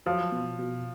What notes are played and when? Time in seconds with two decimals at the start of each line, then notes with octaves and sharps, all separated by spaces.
0.06 F3 F#3
0.32 B2
0.59 B2